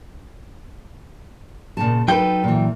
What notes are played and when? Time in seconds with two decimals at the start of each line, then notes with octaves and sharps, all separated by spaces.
1.77 A#2 C#3 A5
2.08 F#3 D#4 A4 B4 G5
2.44 A#2 E3